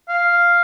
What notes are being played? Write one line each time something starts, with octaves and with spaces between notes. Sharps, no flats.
F5